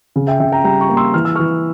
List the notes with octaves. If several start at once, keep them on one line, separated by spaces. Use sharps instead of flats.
C#3
E5 G5
C#3 E5 G5
G5 A#5
G3 G5 A#5
A#5 C#6
A#3
C6 E6
E3 F6
E6
C#6 F6
E3